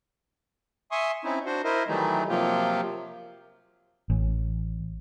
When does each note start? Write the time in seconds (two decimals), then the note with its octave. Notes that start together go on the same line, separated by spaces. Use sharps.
0.91 E5 G#5 C6 C#6 D#6
1.24 C4 C#4 D#4 E4
1.46 D4 F#4 C5
1.64 E4 A#4 C5 D#5
1.88 D#3 E3 F#3 G3 A3 D#4
2.28 C3 F3 F#3 A#3 F4 G4
4.10 A1